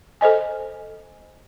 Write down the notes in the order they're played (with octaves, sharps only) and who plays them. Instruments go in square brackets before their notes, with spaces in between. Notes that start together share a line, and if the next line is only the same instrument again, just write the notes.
[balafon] A4 C5 D#5 G#5